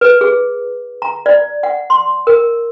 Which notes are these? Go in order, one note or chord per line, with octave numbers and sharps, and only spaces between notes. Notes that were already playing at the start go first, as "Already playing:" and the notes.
B4
G#4
A#5
D5
F#5
C6
A#4